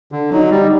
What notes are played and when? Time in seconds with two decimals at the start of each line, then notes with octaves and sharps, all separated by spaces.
0.12 D3
0.32 F#3 D#4
0.51 G3